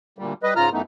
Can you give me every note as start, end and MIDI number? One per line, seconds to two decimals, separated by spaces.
0.18 0.33 38
0.18 0.33 46
0.18 0.33 55
0.43 0.54 55
0.43 0.54 71
0.43 0.54 75
0.56 0.70 44
0.56 0.70 49
0.56 0.70 65
0.56 0.70 82
0.56 0.70 89
0.73 0.82 42
0.73 0.82 52
0.73 0.82 57
0.73 0.82 59
0.73 0.82 63